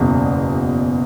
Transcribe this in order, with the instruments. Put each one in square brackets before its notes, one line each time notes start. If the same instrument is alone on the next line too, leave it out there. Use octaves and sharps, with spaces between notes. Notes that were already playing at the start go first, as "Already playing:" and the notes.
Already playing: [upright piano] F#1 E2 B2